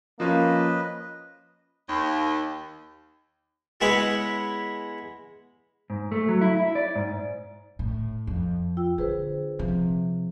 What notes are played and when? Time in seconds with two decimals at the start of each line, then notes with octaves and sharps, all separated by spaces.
0.20 F3 A#3 C#4 B4 D#5
1.89 D#2
3.81 G#3 B3 E4 G#4 B4 C#5
5.90 G#2
6.12 A3
6.29 F#3
6.41 E4
6.57 E4
6.75 D5
6.96 G#2
7.79 A2
8.27 F2
8.77 F4 G5 E6
8.98 D3 G#4 B4 C5
9.59 C3 F3